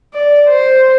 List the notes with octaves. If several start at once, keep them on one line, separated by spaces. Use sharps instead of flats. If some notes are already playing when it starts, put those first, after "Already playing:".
D5
C5